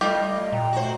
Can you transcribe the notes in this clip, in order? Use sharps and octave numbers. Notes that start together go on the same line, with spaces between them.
G3 A3 F4 G4 D#5
A#2 G5 A#5
A3 F#4 C5